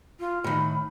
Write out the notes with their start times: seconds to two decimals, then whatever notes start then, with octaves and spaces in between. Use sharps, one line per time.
0.19 F4
0.44 A2 D#3 B5